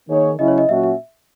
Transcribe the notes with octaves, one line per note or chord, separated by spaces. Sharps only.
D#3 A#3 D#4 G#4 C#5
C#3 F#3 C#4 E4 D#5
C#5
D#5
A#2 F#3 C#4 F#4 E5
E5